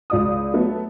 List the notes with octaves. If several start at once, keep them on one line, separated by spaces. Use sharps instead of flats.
C#2 D5 D#6
F#3 A3 B3